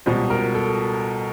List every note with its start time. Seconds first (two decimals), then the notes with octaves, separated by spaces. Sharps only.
0.06 C#2 B2 G3 C5
0.30 A#4
0.55 A4